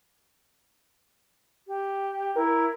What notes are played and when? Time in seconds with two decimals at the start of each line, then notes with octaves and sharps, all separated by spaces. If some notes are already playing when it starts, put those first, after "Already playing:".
1.67 G4
2.36 E4 A#4